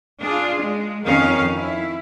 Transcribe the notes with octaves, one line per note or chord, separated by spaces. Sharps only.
D4 F4 G#4
G#3
F2 D#3 C#4 F5
E4